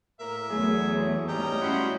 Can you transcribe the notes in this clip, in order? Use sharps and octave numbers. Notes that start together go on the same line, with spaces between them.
A2 A#3 A#4 E5
E2 F#3 A3 G#4
G#2 G3 C#4 D#5 G5 A#5
G3 C#4 E4 F#4 F#5 C6